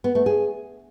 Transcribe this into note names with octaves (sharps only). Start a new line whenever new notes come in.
B3
A3
G#4